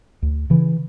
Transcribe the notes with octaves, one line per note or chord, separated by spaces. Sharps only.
D2
C#3 E3